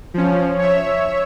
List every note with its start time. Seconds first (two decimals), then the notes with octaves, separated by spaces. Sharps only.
0.14 F3 C#4
0.59 C#5 E5